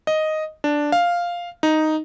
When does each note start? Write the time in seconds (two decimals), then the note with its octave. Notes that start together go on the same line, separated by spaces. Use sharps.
0.07 D#5
0.64 D4
0.92 F5
1.63 D#4